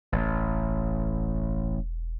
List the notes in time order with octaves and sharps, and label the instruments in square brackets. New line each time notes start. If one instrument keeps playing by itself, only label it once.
[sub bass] E1 [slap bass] A1